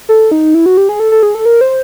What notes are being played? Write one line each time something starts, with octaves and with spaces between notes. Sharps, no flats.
A4
D#4
E4
F#4
G4
G#4
A4
A4
G#4
A4
A#4
C5